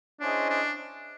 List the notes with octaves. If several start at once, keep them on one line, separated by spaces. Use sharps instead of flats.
C#4 D4 E4 G#4 C5 D#5
D4